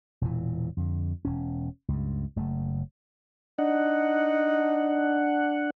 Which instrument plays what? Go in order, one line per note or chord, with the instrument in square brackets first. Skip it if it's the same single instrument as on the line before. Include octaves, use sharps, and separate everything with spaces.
[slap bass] E1 A#2 E3
F2 D3
E1 C#4
C#2 G2
F#1 C#3 A3
[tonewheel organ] D4 F#5 [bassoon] D#4